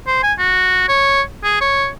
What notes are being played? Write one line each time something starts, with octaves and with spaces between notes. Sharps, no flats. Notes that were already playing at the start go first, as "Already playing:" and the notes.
C5
G#5
F#4
C#5
G#4
C#5